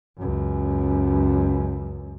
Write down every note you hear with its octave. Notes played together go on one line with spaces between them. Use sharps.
C#2 F#2